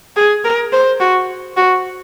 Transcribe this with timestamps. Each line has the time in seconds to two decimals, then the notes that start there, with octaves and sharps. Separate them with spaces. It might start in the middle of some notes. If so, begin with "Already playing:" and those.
0.17 G#4
0.44 A#4
0.73 C5
1.00 F#4
1.57 F#4